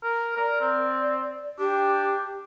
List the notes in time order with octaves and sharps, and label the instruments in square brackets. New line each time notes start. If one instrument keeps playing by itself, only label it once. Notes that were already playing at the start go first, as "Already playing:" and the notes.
[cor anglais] A#4
[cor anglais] A#4 [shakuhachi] D5
[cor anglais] C4
[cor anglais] D4 [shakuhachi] G4